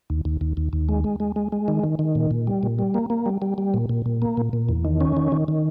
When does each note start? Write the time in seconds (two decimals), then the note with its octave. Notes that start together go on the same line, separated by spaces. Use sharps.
0.10 D#2
0.25 D#2
0.41 D#2
0.57 D#2
0.73 D#2
0.89 G#3
1.04 G#3
1.20 G#3
1.36 G#3
1.52 G#3
1.68 D#3
1.84 D#3
1.99 D#3
2.15 A#2
2.31 A#2
2.47 G3
2.63 A#2
2.79 G3
2.94 A#3
3.10 A#3
3.26 G3
3.42 G3
3.58 G3
3.74 A#2
3.89 A#2
4.06 A#2
4.22 A#3
4.37 A#2
4.53 A#2
4.69 E2
4.85 D#3
5.01 C#4
5.17 D#3
5.32 D#3
5.48 D#3